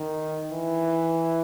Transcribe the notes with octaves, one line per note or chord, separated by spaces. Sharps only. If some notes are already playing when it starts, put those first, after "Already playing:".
Already playing: D#3
E3